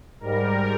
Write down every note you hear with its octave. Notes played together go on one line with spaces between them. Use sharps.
G#2 G3 A#4